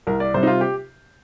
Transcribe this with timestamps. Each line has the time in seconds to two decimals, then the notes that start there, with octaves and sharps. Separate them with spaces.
0.07 C2 A#4
0.20 D5
0.34 C3 G3 C4 C5
0.43 D#4
0.47 F4
0.61 G4